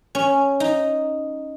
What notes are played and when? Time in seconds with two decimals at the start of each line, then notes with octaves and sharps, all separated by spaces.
0.15 C#4
0.60 D#4